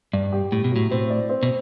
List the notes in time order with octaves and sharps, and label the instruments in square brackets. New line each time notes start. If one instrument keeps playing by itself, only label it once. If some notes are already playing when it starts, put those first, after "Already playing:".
[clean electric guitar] G2 [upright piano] D5
[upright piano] G4
[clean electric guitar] A2 [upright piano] G4
[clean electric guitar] B2
[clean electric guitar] A2 [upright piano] F#3
[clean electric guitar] A2 [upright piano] C4
[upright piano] D5
C4
[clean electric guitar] B2